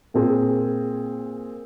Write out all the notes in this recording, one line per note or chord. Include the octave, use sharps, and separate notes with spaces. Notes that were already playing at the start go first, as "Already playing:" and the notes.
A#2 C4 G#4